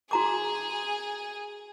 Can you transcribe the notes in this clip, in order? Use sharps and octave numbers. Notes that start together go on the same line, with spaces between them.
F#4 G#4 A#5 D6